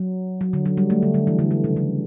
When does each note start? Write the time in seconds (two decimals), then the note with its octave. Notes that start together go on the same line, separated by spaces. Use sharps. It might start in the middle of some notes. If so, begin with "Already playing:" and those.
Already playing: F#3
0.41 F#3
0.53 D3
0.65 F#3
0.77 G3
0.90 A3
1.03 D3
1.14 D3
1.27 E3
1.39 D3
1.51 D3
1.64 C#3
1.76 D3